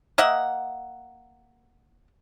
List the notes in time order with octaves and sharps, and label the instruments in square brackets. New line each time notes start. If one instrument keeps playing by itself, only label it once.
[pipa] A#3 D#5 E5 F#5